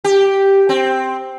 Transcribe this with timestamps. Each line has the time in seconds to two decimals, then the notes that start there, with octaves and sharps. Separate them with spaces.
0.04 G4
0.69 C4